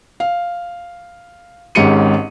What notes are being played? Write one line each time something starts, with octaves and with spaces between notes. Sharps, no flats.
F5
G#1 G#2 C#4 G4 C#7 D#7